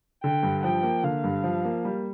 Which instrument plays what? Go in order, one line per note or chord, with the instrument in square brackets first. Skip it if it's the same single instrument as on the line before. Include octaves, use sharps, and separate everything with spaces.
[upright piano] D3 [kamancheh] G5
[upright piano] G2
[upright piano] F3 [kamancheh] G5
[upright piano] A#3
[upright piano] D3 [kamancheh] F5
[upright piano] G2
F3
A#3
G3